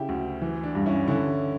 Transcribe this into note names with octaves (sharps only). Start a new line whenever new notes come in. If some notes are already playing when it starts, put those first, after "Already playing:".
Already playing: C#3 E4 G4
D2
E3
D4
G2
C#4 E4
D3 C#4 E4